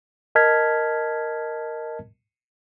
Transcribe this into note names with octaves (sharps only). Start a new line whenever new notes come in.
A#4 D#5 A5 F6 G#6 B6